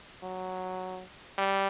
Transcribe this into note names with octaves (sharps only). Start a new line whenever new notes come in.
F#3
G3